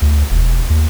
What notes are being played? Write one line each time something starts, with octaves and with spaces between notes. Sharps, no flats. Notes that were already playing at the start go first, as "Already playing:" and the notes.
D2
E1
D#2